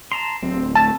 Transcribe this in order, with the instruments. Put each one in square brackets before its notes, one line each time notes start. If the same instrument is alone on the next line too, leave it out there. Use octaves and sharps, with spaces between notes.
[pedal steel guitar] A5 A#5 C6
[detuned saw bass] D1 [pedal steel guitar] C4
[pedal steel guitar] A3 [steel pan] A5